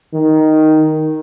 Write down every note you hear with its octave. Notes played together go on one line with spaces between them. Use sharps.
D#3